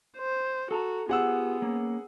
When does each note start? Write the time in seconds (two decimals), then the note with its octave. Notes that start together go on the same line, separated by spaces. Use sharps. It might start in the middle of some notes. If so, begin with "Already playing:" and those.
0.17 C5
0.71 F#4 A4 A5 A#5
1.09 B3 F4 G4 G#4 C5 F#5 E6
1.62 A#3 C#4